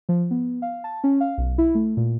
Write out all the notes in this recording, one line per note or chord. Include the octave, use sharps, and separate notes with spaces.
F3
B3
F5
A5
C#4
F5
B1
E4
A3
A#2